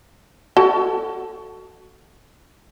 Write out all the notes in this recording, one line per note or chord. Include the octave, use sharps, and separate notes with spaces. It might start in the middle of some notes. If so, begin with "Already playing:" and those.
F#4 A4 A5